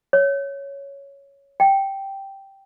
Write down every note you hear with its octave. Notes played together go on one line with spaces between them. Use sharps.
C#5
G5